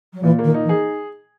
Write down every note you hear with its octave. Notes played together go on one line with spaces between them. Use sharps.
F#3
A#2 E3
D#3 A#3
D#4
E3
G#4